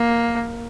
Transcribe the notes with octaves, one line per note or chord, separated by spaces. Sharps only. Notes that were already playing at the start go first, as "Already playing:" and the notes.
Already playing: A#3